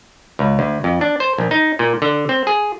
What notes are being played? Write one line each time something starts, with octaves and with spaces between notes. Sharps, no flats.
C#2
D2
F2
D4
C5
A#1
D#4
A#2
D3
C4
G#4